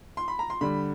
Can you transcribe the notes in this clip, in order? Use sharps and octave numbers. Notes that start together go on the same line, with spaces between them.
C6
B5
A#5
C6
D3 G3 B5